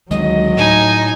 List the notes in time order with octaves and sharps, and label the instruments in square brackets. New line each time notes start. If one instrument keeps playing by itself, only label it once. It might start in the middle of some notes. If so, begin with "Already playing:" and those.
[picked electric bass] D2 D#3 G#3 [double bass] F#3 [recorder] D#5
[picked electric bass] A2 [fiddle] D#4 G#5